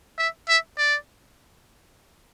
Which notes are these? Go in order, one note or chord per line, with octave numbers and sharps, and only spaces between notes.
E5
E5
D5